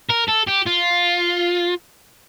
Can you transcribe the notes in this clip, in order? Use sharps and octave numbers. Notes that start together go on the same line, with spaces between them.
A#4
A4
G4
F4